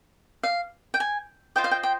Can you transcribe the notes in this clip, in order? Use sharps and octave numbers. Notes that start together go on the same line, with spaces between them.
F5
G5
G#5
F4 C5 D#5 G5
F5
G5
G5